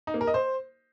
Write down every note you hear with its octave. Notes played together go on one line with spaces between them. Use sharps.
D#4
A#3
A#4
D#5
C5